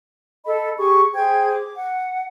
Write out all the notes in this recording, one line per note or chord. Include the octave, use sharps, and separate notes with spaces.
A4 D#5 B5
G4 G#4 C#6
G#4 C5 G5 G#6
D6
F#5